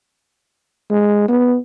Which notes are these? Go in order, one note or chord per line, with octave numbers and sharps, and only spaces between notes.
G#3
B3